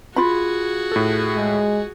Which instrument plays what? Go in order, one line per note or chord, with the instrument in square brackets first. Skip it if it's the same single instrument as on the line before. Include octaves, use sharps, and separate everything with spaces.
[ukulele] F4 B5 [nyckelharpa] F#4 G#4
[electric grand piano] A2 A4
[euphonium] G#3